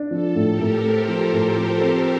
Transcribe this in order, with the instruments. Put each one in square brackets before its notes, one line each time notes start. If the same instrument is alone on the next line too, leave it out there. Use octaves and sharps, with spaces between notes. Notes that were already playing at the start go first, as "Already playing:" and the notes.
Already playing: [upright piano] D4
[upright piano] F3 [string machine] A4
[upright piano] A2
[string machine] G4 A#4
[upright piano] A2
[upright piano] A3 [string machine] A4 C5
[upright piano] F3
A2
F3
C4